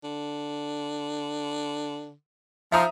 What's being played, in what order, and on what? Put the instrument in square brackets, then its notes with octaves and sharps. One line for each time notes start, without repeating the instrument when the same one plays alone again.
[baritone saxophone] D3
[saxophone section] F3 [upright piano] E5 A#5 D#6